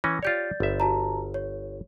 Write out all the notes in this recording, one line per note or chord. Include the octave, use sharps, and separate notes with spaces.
E3 C#4 A#6
F4 G4 C#5 D5 G6 A6
G1 E5
F#4 A5 A#5
C#5